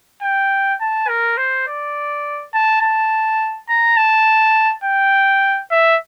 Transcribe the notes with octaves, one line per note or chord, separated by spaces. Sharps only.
G5
A5
A#4
C5
D5
A5
A5
A#5
A5
G5
E5